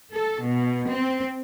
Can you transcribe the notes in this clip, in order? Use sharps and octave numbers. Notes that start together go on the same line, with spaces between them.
A4
B2
C4